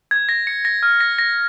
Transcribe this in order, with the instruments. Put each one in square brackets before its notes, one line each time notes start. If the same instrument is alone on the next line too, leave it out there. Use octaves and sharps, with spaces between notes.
[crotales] G#6
A#6
C#7
A#6
F6
A#6
A#6